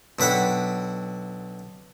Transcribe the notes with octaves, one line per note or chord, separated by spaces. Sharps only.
B1 D3 B4 F#5 G5